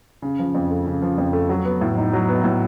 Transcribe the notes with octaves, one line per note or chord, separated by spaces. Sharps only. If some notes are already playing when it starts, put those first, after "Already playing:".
C#3
F3
F2
A3
C#3
F3
F2
A3
F#3
B3
A2
D#4
F#3
B3
A2